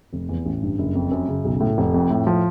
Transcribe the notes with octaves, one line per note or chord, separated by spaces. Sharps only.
F1
E2
A1
G2
F#1
F2
F#2
C#3
B1
A2
F1
F2
A2
F3